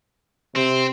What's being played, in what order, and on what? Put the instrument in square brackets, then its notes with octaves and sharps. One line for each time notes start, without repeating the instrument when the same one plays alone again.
[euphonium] C3 [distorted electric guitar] C4